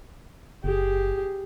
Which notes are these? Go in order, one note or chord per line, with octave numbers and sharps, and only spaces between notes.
F#1 G4 G#4